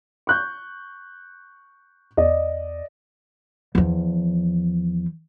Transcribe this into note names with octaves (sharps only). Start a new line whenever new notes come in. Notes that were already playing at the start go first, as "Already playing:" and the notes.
C#6 F#6 G6
E2 D5 D#5
E2 F3